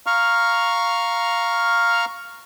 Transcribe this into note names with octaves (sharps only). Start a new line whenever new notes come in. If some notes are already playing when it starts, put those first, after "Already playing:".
F5 A#5 C#6 F6